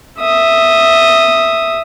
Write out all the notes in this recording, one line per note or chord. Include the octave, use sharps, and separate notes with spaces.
E5 D#6